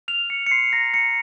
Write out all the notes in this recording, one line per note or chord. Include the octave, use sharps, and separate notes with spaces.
F6 F7
F6 C#7
C#7
C6 C7
A#5 A#6
A#5 C#7